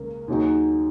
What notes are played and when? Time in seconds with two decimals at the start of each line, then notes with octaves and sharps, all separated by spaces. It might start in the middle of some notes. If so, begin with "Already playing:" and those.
Already playing: C#2 C#3 A#3
0.28 D#2 D#3 F#3 D#4 G#4